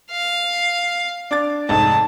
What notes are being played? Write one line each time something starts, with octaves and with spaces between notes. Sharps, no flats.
F5
D4 D6 A6
F1 G#2 A5